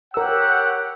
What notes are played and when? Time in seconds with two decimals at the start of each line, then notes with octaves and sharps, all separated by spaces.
0.14 G4 A#4 C#5 F#5 E6